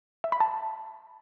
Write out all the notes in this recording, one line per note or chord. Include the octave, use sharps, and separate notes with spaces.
E5
B5
A5